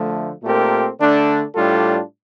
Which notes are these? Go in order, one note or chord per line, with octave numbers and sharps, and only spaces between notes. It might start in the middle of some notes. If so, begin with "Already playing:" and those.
Already playing: D3 F3 A3
A#2 A3 C4 G4 A#4
D3 A3 D4
A2 G3 D4 F4 A4